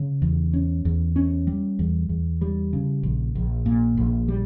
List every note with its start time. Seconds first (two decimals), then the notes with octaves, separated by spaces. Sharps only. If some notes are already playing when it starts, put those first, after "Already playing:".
Already playing: C#3
0.22 E2
0.53 C#4
0.85 E2
1.16 C#4
1.47 G3
1.79 E2
2.09 E2
2.41 G3
2.73 C#3
3.03 A#1
3.35 A#1
3.66 A#2
3.97 A#1
4.28 G3